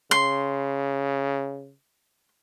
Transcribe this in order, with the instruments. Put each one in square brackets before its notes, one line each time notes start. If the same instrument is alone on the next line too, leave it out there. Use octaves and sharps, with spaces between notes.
[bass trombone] C#3 [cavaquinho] C6